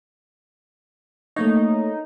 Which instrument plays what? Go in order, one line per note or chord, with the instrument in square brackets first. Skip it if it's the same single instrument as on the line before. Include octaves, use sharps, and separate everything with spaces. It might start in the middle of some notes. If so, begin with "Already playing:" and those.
[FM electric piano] A3 A#3 C#5 [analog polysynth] D#4